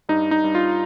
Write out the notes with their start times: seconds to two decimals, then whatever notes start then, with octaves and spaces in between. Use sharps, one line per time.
0.09 G2 D#4
0.31 D#4
0.44 G2
0.55 F4